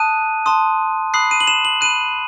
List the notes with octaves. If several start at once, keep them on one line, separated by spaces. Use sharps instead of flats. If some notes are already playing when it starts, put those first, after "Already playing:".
Already playing: A5 D#6 F#6 D#7
A5 C6 D#6
B5 D#6 F#6 C7
D#7
F#7
E7
F#7
B5 F#6 D#7